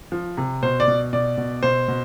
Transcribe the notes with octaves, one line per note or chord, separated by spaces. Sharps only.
F3
C3
B2 C5
D5
B2
B2 D5
B2
B2 C5
B2